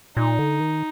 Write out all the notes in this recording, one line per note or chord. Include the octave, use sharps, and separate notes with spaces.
A#2 D#4
D3
D#3